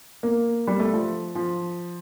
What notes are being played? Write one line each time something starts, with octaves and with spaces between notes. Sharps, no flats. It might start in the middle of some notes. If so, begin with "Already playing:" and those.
A#3
G3
A3
F3
F3